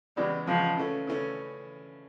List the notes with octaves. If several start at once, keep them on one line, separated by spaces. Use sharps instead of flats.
E2 C#3 E3 G3 G#3
E2 C#3 E3 F3 G#3
C#3 E3 A3 C#4
C#3 E3 A3 C#4